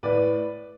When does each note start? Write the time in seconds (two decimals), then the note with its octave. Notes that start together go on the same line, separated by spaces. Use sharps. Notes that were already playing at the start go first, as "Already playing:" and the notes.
0.03 A2 B4 D5